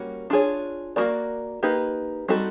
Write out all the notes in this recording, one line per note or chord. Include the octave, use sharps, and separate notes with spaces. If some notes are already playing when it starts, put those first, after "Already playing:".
Already playing: G3 A#3 C#4 F#4
D4 F4 G#4 C#5
A#3 D4 F#4 A#4 D5
A#3 D#4 G4 B4
G3 C4 D#4 F#4 A4